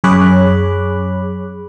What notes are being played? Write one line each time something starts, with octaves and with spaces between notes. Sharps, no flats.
F#2 G#4 C#5 B5 D6 F#6